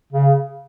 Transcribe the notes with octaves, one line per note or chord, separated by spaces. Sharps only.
C#3